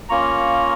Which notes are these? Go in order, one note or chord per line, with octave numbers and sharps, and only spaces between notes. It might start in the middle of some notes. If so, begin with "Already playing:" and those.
A#3 C#4 F4 A#5 C#6